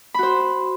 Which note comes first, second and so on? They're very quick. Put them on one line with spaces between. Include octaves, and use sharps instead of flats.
B5 F#4 C5